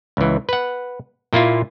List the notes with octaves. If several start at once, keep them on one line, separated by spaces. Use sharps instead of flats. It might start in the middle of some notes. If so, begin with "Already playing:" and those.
C#2 E3
B4 F#5
A#2 A#3 E4 F4